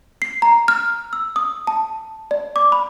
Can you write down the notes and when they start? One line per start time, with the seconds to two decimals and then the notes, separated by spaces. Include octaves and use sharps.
0.22 C7
0.42 A#5
0.68 F6
1.13 E6
1.36 D#6
1.67 A5
2.31 D5
2.56 D6
2.72 B5